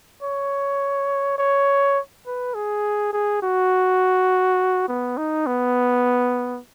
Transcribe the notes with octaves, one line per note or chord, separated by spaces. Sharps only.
C#5
C#5
B4
G#4
G#4
F#4
B3
D#4
B3